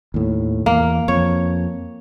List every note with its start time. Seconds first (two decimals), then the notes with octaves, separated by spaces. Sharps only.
0.14 D#2 A2
0.66 E2 A#3
1.08 F2 C#5